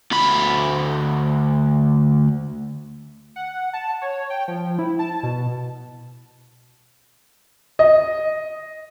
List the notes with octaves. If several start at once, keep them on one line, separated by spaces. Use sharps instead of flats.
D2 B5
F#5
A5
C#5
G5
F3
E4
A5
B2
D#5